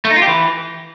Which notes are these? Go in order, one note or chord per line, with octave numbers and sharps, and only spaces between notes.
A3
D#4
F4
G4
E3